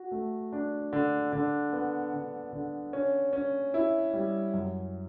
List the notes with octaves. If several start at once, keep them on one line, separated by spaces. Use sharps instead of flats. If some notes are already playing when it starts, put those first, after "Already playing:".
Already playing: F#4
A3
D4
D3
D3
B3
D3
D3
C#4
C#4
E4
G3
F#2